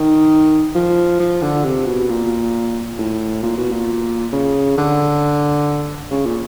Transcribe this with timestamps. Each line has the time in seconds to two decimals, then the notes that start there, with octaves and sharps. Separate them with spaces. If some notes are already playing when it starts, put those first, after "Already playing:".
Already playing: D#3
0.75 F3
1.20 F3
1.42 D3
1.65 C3
1.87 B2
2.09 A#2
2.99 A2
3.43 A#2
3.57 B2
3.71 A#2
4.33 C#3
4.78 D3
6.11 C#3
6.26 A#2